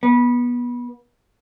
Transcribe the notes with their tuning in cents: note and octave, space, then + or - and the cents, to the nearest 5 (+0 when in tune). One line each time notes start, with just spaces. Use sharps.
B3 -25